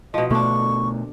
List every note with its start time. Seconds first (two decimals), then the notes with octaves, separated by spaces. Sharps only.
0.14 B2 F3 D#5
0.31 B2 D3 A3 B3 D4 C#6